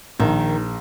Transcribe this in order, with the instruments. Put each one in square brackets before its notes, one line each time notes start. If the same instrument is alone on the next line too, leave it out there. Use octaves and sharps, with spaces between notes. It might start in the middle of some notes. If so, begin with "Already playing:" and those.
[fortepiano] A#1 [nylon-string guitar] D#3